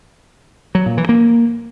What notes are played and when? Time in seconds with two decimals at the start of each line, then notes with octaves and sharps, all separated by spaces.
0.75 F#3
0.86 A#2
0.98 E3
1.09 A#3